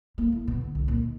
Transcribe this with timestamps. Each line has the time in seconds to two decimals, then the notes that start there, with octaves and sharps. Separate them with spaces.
0.18 A#3
0.32 A2
0.48 B2
0.61 D3
0.75 C2
0.88 A#2
1.03 D#3